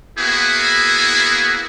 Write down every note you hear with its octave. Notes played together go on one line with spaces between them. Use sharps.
A#3 B3 E4 F#4 G#4